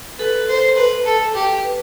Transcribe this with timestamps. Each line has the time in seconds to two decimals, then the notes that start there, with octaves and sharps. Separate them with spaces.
0.19 A4 B4
0.48 C5
0.76 B4
1.05 A4
1.35 G4
1.64 B4